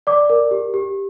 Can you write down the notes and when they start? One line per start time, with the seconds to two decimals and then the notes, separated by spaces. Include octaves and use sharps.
0.07 D5 D6
0.30 A#4
0.51 G4
0.74 G4